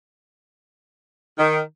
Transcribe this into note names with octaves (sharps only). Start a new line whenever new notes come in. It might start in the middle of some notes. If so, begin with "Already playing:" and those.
D#3